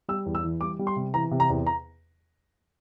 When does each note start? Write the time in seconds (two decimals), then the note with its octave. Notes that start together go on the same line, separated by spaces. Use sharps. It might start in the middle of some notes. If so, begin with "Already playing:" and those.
0.08 G3 E6
0.26 E2
0.35 E6
0.44 E3
0.61 G3 D6
0.79 G3
0.87 C6
0.96 C3
1.14 E3 A#5
1.31 C3
1.40 A#5
1.49 E2
1.66 A#5